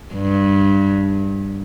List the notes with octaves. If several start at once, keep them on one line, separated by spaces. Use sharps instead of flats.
G2